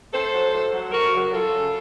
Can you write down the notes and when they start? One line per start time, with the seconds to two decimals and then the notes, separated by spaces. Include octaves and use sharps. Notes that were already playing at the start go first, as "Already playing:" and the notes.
0.13 A2 A4 C5
0.34 F#3
0.53 A2
0.73 F#3
0.92 F#2 F#4 A#4
1.12 C#3 F#3
1.32 F#2 F4 A4
1.51 C#3 F#3